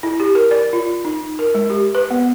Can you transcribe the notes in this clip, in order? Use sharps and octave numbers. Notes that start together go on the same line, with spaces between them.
E4
G4
A#4
D5
F4
D#4
A#4
G#3
G4
B4
B3